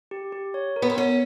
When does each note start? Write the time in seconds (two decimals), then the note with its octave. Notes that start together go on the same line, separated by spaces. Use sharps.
0.11 G4
0.32 G4
0.54 C#5
0.76 A#4
0.82 B3
0.90 C4
0.97 B3 C#4